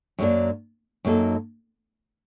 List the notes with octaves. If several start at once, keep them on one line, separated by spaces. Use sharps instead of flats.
F#2 F#3 A#3 D4
F#2 F#3 A#3 D#4 A4